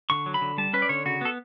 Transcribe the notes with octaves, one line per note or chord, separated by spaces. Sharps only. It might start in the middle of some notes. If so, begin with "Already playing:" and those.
D3 C#6
F#3
B5
D3
G3 A5
C#4 B4
D5
D3 C#5
C#3 F#4
B3 A4